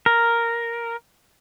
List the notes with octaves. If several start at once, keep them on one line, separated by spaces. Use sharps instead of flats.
A#4